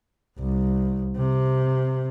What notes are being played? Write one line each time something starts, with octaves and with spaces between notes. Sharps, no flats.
C2
C3